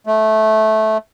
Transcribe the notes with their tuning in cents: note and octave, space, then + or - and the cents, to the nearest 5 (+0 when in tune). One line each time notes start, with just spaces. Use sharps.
A3 -15